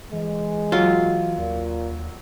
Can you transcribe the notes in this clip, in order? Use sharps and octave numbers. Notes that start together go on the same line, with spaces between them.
E3 G#3
F#3 F4
D#2 A#2